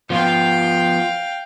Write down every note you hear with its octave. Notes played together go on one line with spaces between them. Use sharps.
F3 B3 F4 F5 G5